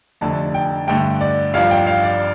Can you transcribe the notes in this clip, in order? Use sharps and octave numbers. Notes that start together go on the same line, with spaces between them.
F1 F2 D3 A3 D4 A5
G5
G2 D3 A3 G5
D5
A1 G2 F3 D4 F5
G5
F5
D5